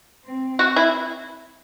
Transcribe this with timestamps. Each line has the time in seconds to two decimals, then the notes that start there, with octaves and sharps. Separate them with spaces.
0.25 C4
0.59 F#4
0.76 E4